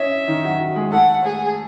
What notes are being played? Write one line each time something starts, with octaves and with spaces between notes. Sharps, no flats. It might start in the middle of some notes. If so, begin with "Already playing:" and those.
Already playing: C#4 C#5 D#5 E5
D#3 D#4
F#3 F#4
F#3 F#4
G#3 G#4
A3 A4 F#5
G#4